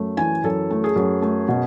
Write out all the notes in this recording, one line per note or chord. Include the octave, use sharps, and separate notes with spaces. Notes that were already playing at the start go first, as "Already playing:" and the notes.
Already playing: F#2 A3
E3 G#5
F#2 A4
A3
G#4
F#2
A3
B2